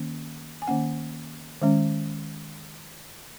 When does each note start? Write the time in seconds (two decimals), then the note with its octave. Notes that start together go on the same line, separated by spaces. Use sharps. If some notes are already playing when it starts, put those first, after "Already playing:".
Already playing: D#3 A#3 C#4
0.62 G#5
0.67 D#3 A#3 C#4 F#5
1.62 D#3 G#3 C#4